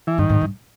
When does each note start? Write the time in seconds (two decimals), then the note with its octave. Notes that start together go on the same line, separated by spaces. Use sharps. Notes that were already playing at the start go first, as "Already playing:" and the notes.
0.07 E3
0.18 G2 D#3
0.29 G#2
0.41 G2